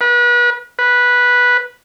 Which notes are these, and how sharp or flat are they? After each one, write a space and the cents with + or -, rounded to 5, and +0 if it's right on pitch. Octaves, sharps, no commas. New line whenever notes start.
B4 -35
B4 -10